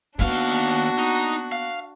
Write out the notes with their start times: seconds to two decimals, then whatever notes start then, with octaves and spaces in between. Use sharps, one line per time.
0.19 D#2 A#3 B3 D4 F#4 F5
0.98 D#4
1.52 F5